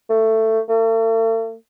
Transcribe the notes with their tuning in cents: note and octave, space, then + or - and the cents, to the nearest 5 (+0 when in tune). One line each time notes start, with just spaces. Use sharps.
A3 +15
A3 +45